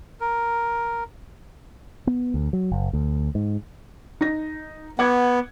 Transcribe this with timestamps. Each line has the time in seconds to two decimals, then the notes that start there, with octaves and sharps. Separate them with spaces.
0.20 A#4
2.07 B3
2.34 D2
2.53 F#3
2.71 F#1
2.93 D2
3.35 G#2
4.21 D#4 A#6
4.99 B3 F#5 D6 G#6